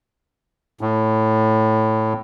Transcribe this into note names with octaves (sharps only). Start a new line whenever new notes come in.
A2